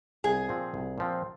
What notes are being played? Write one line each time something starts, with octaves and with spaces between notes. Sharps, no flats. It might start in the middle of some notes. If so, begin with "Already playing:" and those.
C2 G#4
A#2 F3 C4
C2
A#2 F3 C4